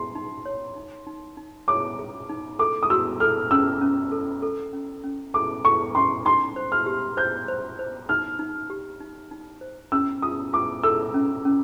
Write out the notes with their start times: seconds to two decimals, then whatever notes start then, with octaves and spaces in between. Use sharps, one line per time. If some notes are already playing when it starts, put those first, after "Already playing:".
Already playing: C6
0.15 D#4
0.46 C#5
0.76 D#4
1.07 D#4
1.37 D#4
1.68 C#5 D6
1.99 G#4
2.29 D#4
2.59 A4 D6
2.83 D#6
2.90 F#4 E6
3.20 A4 F6
3.51 C#4 E6
3.81 C#4
4.11 A4
4.42 A4
4.73 C#4
5.04 C#4
5.34 A4 D6
5.64 A4 C#6
5.95 C#4 C6
6.25 D#4 C6
6.56 C5
6.72 F6
6.86 G4
7.17 C5 G6
7.48 C5
7.79 C5
8.09 D#4 F6
8.39 D#4
8.70 G4
9.00 D#4
9.31 D#4
9.61 C5
9.92 C#4 E6
10.22 F4 D#6
10.53 F4 D6
10.83 A4 E6
11.14 C#4
11.45 C#4